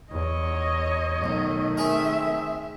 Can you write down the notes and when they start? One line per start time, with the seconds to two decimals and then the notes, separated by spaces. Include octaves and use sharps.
0.12 E2 C#5 D#5
1.24 B1 D#3 A3
1.77 C4 G#4 A#4 E5